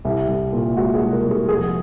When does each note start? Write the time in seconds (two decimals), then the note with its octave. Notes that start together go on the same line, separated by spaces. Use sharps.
0.05 C2
0.28 C2
0.53 A#2
0.76 G#3 F#4
0.95 G#4
1.01 C2
1.12 A#4
1.25 C2
1.31 G#4
1.49 F2 G#4